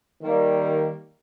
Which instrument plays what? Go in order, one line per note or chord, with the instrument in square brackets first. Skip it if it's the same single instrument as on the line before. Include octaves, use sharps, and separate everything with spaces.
[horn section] D#3 G3 A#3